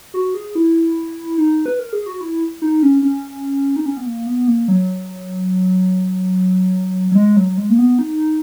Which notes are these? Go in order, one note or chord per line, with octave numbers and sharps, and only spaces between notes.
F#4
G#4
E4
D#4
B4
A#4
G#4
F#4
E4
D#4
C#4
C#4
D#4
C#4
B3
A#3
B3
A#3
F#3
F#3
G#3
F#3
G#3
A#3
B3
D#4